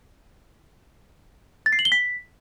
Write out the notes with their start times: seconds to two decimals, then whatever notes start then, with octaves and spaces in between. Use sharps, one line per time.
1.66 A6
1.72 C7
1.79 F#7
1.85 G7
1.92 B6